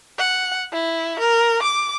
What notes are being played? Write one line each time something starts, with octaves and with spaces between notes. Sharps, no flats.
F#5
E4
A#4
D6